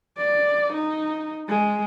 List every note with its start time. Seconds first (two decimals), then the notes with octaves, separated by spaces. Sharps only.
0.17 D5
0.73 D#4
1.48 G#3